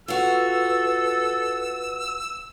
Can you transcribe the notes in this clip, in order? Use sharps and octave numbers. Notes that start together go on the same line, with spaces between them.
F4 F#4 A4 B4 E6